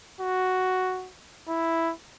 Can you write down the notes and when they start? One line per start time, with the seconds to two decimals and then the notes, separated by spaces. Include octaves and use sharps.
0.20 F#4
1.48 E4